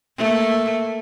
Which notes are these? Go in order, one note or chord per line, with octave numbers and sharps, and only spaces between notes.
A3 A#3